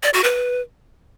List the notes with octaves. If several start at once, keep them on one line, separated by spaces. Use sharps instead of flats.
D5
F#4
B4